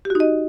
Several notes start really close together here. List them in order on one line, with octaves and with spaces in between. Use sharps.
G4 F#4 D#4 D#5